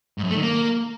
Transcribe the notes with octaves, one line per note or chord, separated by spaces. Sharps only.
G#2
F#2
A3
D#3
A#3